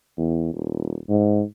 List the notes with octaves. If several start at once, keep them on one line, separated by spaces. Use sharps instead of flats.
E2
D#1
G#2